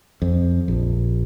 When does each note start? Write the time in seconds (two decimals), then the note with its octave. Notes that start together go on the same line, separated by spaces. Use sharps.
0.22 F2
0.68 A#1